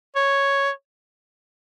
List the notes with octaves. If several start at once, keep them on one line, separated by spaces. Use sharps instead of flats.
C#5